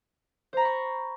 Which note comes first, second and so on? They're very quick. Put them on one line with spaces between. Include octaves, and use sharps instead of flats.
C5 A#5 B5 C#6